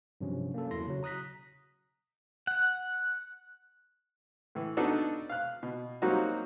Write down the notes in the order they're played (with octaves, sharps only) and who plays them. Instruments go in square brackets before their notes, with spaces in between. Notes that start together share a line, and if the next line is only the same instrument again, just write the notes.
[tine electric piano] G2 C3 F3 F#3 C#4
A#3 C#4 A4
E2 F#3 E4 C6 A#6
C#3 F#3
A#5 D#6 F#6 A#6 B6
[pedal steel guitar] F#5
[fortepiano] A2 E3
B3 D4 D#4 F#4 A4
F5 F#6
B2
F#3 G3 A#3 C4 D#4 F#4